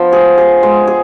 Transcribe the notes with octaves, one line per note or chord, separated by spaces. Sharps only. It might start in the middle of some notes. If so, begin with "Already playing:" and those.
Already playing: F3 B3
G#4
G#4
G#3
G#4